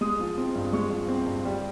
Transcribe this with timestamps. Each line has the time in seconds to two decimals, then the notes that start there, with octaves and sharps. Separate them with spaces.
0.01 G#3 D#6
0.20 F3
0.38 C4
0.55 G2
0.73 G#3 C#6
0.91 F3
1.08 C4
1.26 G2
1.45 G3